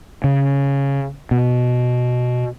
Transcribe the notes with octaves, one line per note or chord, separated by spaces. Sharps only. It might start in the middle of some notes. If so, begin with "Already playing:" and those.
C#3
B2